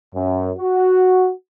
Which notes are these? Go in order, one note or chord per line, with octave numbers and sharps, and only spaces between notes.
F#2
F#4